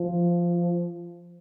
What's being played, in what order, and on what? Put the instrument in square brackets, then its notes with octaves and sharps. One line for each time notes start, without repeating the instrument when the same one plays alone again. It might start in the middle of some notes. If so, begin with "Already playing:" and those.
Already playing: [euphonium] F3